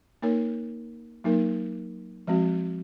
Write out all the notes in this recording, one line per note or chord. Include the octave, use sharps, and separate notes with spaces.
A#3 D#4 A#4 C#5
F#3 A#3 D#4 A#4
F3 G#3 C4 F#4